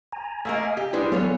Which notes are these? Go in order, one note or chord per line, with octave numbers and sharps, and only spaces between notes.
G#5 A#5
A3 A#3 A#4 D#5 F5 G#5
G4
G3 G#3 D4 E4 B4
E3 F#3 B3 F4 A4 C#5